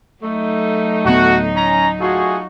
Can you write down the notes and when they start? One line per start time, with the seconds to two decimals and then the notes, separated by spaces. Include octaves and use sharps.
0.23 F#3 A3 D#4
1.06 D1 B3 F#4
1.55 C#4 A#5
2.00 A3 F4 F#4 G#4